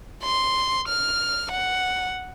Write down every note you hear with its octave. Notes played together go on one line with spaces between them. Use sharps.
C6
F6
F#5